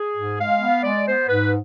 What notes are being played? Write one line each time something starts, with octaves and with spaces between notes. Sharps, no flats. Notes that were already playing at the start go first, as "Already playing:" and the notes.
Already playing: G#4
G#2
G#3 F5
B3
G#3 D5
B3 C5
G#2 B4